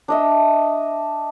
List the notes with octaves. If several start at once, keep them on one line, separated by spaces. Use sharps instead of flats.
D4 D#5 E5